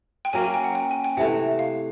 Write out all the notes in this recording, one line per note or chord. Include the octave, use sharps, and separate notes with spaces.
G5
F#3 A#3 C#4 G#5
G#5
G5
F#5
G5
G#5
G5
C3 E3 A3 F#5
F5